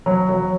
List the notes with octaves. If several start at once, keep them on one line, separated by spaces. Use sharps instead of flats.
F#3
F#3